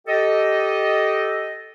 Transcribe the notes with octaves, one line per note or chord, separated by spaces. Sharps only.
G4 A4 D#5